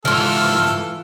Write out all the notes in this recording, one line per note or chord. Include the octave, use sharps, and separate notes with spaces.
C#2 G#2 E3 F4 A4 F6